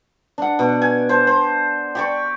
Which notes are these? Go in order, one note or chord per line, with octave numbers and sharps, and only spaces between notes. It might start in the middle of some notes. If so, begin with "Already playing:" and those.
D4 F#5
B2
G#5
C5 A5
C5
G4 D5 C#6